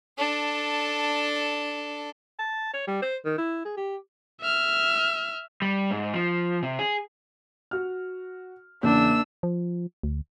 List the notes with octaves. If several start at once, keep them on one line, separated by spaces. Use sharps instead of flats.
D4 A4
A5
C#5
G3
C5
D#3
E4
G#4
G4
E5 F6
G3
G#2
F3
C3
G#4
F#4 F6
E2 C#3 A#3 D4 E6
F3
D2